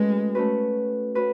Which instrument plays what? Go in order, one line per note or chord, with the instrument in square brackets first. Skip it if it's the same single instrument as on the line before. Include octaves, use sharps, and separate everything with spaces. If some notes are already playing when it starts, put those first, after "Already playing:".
Already playing: [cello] G#3 [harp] A3 C#4 F#4 B4
[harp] A3 C#4 F#4 B4
C#4 F#4 B4